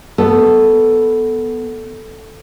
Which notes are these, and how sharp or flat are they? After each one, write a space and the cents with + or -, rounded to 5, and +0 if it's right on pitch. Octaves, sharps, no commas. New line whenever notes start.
B3 +0 A4 +0